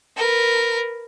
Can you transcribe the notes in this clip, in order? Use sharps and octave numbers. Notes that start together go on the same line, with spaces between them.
A#4 B4